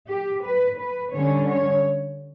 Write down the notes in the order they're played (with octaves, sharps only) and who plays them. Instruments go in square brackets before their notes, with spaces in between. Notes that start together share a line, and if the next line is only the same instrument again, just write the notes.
[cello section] G4
B4
B4
D3 G3 C#4 C#5
C#5